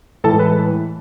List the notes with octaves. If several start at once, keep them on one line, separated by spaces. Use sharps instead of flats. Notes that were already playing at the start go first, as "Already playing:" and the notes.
A2 E3 G#3 A4 A5
B4 B5